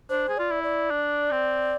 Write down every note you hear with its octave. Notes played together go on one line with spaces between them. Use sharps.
D4 C5
G#4
F4 D5
E4
D5
D4
C4